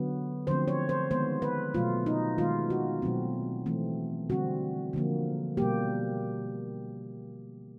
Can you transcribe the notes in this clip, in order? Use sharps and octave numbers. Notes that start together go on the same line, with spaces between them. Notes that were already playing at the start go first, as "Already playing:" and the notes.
Already playing: D3 F#3 B3
D3 F3 A3 C4 C5
C#5
C5
D#3 G#3 B3 C5
B4
B2 F#3 A3 F4
D#4
D#3 G#3 B3 F4
F#4
B2 F#3 A3 C4
E3 A3 C4
D3 G3 C4 F#4
D3 F3 A#3
B2 G3 A#3 G4